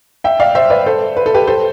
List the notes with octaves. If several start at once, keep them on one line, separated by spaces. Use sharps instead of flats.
E5 G5
D5 F5
C5 E5
B4 D5
A4 C5
B4
A4
G4 B4
A4 C5